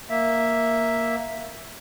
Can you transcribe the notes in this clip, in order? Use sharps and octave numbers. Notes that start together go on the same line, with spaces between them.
A#3 E5